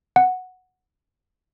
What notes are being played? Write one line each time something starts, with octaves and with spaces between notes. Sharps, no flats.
F#5